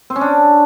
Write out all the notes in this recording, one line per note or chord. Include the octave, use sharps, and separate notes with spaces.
C4
C#4
D4